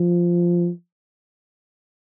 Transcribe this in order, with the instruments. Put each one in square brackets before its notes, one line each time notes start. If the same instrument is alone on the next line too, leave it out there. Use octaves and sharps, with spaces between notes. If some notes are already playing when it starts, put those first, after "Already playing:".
Already playing: [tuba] F3